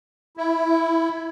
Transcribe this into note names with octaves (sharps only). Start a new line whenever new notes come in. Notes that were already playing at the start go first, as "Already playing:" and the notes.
E4